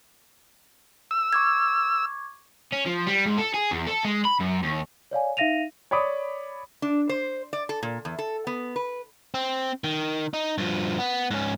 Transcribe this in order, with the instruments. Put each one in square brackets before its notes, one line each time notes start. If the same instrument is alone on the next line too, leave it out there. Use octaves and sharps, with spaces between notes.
[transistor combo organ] E6
[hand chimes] C#6 D6 G#6
[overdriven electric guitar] C#4
F3
G3
G#2
A4
G#4
E2
A4
G#3
B5
F#2
D#2
[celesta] C#5 D5 F5 G#5
D#4 E5 F5 A#6 D#7 F7
[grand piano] C#5 D5 B5 D6 D#6
[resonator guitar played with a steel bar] D4
C5
D5
A4
A#2
E2
A4
B3
B4
[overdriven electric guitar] C4
D#3
D#4
G2 F3
B3
G#2 C#4